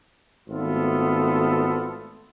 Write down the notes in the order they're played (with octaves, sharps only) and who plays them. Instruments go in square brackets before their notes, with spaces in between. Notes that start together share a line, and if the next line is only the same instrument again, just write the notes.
[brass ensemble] G#1 A3 B3 F4 A4